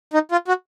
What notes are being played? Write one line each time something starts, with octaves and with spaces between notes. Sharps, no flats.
D#4
F4
F#4